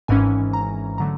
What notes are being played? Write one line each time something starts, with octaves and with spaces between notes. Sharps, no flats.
G#1 G#2 E3 G#3 C#4 G#5
A#5
D3 F#3 A3 A#5